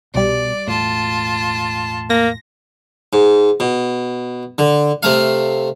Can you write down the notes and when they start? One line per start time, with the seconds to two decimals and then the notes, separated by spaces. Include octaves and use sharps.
0.14 C2 B2 G3 D5
0.67 E1 A2 F4 A5
2.10 A#3 A#6
3.13 G#2
3.60 B2
4.58 D3
5.03 C3 A3 F5